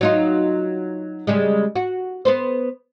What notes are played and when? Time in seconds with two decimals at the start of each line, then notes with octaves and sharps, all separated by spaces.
0.01 F#3 D#4 F4
1.27 C#3 G3 G#3
1.76 F#4
2.25 B3 B4 C5